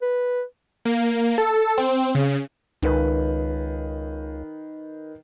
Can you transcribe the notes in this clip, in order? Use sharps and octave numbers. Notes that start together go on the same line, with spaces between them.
B4
A#3
A4
C4
C#3
C#2 D#3 B4